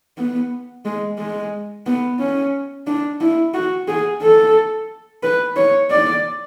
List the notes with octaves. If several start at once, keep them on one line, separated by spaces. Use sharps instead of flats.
B3
G#3
G#3
B3
C#4
D4
E4
F#4
G#4
A4
B4
C#5
D5